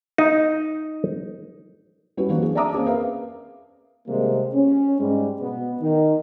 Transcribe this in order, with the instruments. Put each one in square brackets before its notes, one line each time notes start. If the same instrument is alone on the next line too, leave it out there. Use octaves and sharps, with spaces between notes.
[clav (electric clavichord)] D#4
[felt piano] G3 C#4 E4 F#4 G4 B4
E3 F#3 A#3 C4 D4 F#4
G#4
D5 E5 A5 A#5 D6 D#6
A#3 C4 C#4 G#4
A#4 B4 E5 F5
[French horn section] C3 D#3 G3 G#3 A#3 C4
C#4
G#2 G3 G#3
B2 B3
D#3 D#4